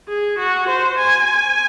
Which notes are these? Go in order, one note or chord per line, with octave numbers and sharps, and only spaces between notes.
G#4
F#4
C5
G#5